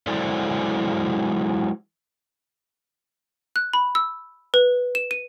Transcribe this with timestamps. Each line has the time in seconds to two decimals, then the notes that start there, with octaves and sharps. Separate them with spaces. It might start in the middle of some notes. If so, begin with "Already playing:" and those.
0.07 F#3 G#3 E4 A4 C5 D5
3.56 F#6
3.74 B5
3.95 E6
4.54 B4
4.95 E7
5.11 D#7